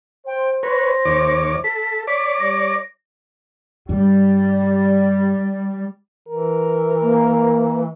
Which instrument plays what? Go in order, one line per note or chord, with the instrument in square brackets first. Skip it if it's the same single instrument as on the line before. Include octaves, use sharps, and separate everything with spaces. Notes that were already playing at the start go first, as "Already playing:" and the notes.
[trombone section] C5 [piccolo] G5
[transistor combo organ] B4 C#5 [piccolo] A#6
[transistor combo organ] D#2 C#5 D6
[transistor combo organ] A4 [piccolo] B6
[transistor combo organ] C#5 D5 D6 [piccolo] B6
[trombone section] G3 [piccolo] A#6
[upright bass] G2 [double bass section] G3
[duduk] E3 [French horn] A#4
[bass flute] A#3